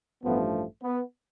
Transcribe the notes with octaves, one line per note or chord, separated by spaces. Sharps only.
A1 G2 F3 A3 B3
B3